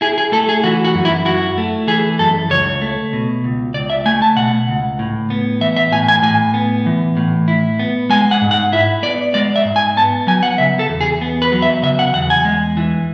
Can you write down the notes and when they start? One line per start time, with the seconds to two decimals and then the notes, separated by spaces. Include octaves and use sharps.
0.01 E4 G#4
0.18 G#4
0.32 A3 A4
0.49 G#4
0.64 E3 F#4
0.85 F#4
0.95 F#2
1.05 E4
1.25 E4 F#4
1.58 A3
1.88 E3 G#4
2.19 F#2 A4
2.50 C#2 C#5
2.81 A3
3.13 B2
3.44 C#2
3.74 C#2 D5
3.90 E5
4.06 A3 G#5
4.22 A5
4.37 B2 F#5
4.68 C#2
4.99 A2
5.30 B3
5.61 E3 E5
5.76 E5
5.92 A2 G#5
6.08 G#5
6.23 A2 G#5
6.54 B3
6.86 E3
7.17 A2
7.48 E4
7.79 B3
8.10 G#3 G#5
8.31 F#5
8.41 G#2
8.51 F#5
8.72 E4 E5
9.03 B3 D5
9.34 G#3 D5
9.56 E5
9.65 G#2
9.76 G#5
9.97 B3 A5
10.27 F#3 G#5
10.43 F#5
10.58 C#3 E5
10.79 A4
10.89 E2
11.01 G#4
11.21 B3
11.42 B4
11.52 F#3
11.62 E5
11.82 C#3 E5
11.99 F#5
12.14 E2 F#5
12.30 G#5
12.45 G#3
12.77 E3